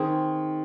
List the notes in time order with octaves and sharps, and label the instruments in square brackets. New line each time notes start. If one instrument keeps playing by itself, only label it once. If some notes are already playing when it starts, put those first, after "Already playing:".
Already playing: [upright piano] D#3 [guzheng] C4 G#4